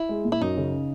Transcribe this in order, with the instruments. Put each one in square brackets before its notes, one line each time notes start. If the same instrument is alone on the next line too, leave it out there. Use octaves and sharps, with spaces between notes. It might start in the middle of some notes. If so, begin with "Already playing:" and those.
Already playing: [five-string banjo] E4
[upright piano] G#3
A#2
[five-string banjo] E4
[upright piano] F#2 [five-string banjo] D#4
[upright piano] C#3